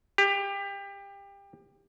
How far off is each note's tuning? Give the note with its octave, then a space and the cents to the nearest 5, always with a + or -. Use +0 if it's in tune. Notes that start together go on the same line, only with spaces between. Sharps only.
G4 +25